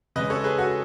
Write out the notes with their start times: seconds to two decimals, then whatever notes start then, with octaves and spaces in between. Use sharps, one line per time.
0.16 C#3 G#3 C#4 B4 D#5
0.30 A4 C#5
0.44 G#4 B4
0.58 F#4 A4